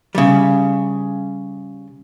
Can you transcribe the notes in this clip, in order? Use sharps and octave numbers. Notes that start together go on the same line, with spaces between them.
C#3 G3